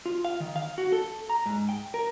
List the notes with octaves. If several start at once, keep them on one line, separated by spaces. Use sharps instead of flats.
F4
F5
D#3
F5
F#4
A4
A#5
G#2
G5
A#4